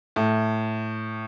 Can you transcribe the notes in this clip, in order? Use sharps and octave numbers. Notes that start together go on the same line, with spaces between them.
A2